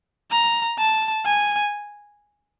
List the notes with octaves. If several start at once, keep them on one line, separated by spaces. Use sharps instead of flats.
A#5
A5
G#5